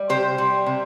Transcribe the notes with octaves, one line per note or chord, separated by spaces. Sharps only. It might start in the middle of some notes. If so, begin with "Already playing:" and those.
Already playing: G3
C3 G4 C5
G3
C3